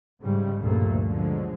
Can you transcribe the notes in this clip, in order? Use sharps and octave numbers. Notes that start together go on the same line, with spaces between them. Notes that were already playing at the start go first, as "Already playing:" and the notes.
G#2 C#3 G3
D2 G2 A#2 F3 A3 A#3
B2 D3 F3 F#3 G#3